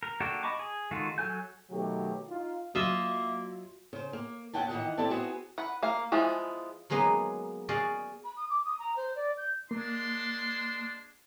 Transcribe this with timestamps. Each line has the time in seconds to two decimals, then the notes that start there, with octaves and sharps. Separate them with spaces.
0.03 A#4
0.20 A#3 D4 F#4 G4 A4
0.43 D#5 A5 B5 C#6 D6
0.59 G#4
0.91 D#3 G#3 F4 F#4 A4
1.18 F#3 A4 G#5 G6
1.70 B2 D#3 F#3 A3 G4
2.29 D#4 F4
2.75 F#3 A#3 F4 D#5 E5
3.93 C#3 C5
4.13 A#3
4.53 D#2 G#3 C#4 F#5 G5 A5
4.69 D#3 E3 F#3 D4 D#5 F#5
4.98 C4 E4 G4 A4 D5 A5
5.10 B3 C4 F#4 G#4
5.58 B4 F#5
5.83 A#3 F5
6.12 E3 F3 G#3 B3
6.90 F#3 G#3 A#3 B3 D#4
7.69 F#4 G#4 D5 D#5 F5
8.24 B5
8.36 D#6
8.49 D6
8.65 D#6
8.79 A#5
8.96 C5
9.15 D5
9.37 G6
9.71 G#3 A#3 D4 C6